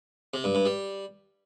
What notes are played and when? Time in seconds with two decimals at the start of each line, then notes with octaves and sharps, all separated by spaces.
0.34 C3
0.44 G2
0.55 G2
0.65 G3